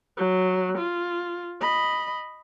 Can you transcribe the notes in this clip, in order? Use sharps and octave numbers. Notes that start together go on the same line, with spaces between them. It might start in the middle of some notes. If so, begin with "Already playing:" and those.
F#3
F4
D#5 B5